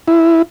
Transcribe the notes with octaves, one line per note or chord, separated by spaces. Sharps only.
E4